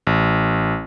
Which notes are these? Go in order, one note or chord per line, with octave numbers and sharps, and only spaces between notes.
A1